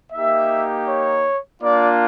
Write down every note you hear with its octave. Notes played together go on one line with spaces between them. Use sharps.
A#3 D#4 G4 E5
C#5
A#3 D4 F4 D5